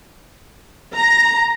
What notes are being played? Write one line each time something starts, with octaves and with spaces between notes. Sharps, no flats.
A#5